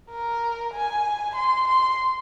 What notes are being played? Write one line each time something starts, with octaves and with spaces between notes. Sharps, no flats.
A#4
G#5
C6
C6